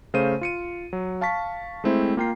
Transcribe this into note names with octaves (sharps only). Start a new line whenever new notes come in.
C#3 A3 C5 F5 D#7
F4 C#7 D#7
F#3
F5 A5 C#6 B6
G#3 A3 C4 E4 C5
A#3 F4 G5 A#5 C7